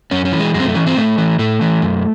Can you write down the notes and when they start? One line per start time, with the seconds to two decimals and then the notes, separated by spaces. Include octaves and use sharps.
0.11 F#2 C#4
0.25 C#4
0.32 E3
0.39 G#3
0.54 F#2 G#3
0.60 C4
0.64 A3
0.75 E3 C#4
0.87 C4
0.96 A2 A3
1.18 E3
1.39 A2 A3
1.61 E3
1.82 F#2